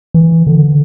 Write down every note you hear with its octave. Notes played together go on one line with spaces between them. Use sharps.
E3
D3